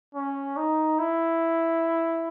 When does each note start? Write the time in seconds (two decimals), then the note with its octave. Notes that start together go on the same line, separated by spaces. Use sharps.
0.14 C#4
0.57 D#4
0.99 E4